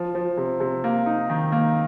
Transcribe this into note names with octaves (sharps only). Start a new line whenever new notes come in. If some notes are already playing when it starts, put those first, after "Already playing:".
Already playing: F3
F3
C3
C3
A#3
D#4
D#3
A#3